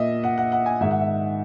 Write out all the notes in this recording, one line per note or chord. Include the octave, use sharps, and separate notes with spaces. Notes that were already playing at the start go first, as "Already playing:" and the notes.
Already playing: A#2 D#5 E5
F#5
F#5
F#5
G#5
G#2 D#3 E5
F#5
E5